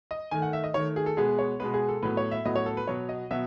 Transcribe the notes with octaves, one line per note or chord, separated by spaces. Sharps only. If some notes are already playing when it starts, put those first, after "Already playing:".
D#5
D#3 A3 G#5
F#5
E5
D#5
D#3 A3 C#5
G#4
A4
B2 G#3 B3 G#4
C#5
B2 G#3 B3 B4
G#4
A4
A2 F#3 B3 B4
C#5
E5
A2 F#3 B3 D#5
C#5
A4
B4
B2 F#3 B3 C#5
D#5
B2 F#3 B3 E5